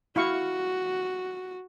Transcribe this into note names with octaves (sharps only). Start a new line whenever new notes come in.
E4 F#4 F5 C#6